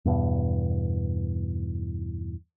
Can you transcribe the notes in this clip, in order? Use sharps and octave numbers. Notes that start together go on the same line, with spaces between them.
E2 G2 B2